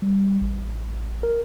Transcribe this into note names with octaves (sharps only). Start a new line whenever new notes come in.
G3
A1
A#4